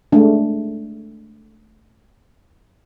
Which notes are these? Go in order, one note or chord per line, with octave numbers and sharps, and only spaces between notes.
G#3 A3 D4